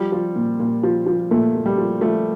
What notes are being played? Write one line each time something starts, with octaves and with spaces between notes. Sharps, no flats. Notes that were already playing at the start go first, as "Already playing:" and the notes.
Already playing: F3 G3
F3
A#2
A#2
F3
F3
A#2 A3
A#2
G3
F3
F3 A3